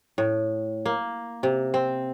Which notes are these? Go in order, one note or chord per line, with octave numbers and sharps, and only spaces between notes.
A2
A#3
C3
C4